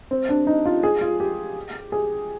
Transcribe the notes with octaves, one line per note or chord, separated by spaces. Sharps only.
C4
D4
D#4
F4
G#4
F4
G4
G#4